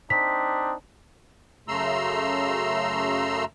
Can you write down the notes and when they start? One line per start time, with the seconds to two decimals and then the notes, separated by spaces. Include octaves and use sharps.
0.10 C4 D4 D#4 B6
1.68 F#2 C#3 A3 A#5 C6 E6